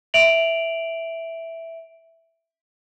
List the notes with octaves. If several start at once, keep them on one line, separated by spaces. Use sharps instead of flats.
E5 D7 F7 F#7